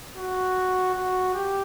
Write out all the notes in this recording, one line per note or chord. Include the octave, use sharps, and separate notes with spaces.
F#4
F#4
G4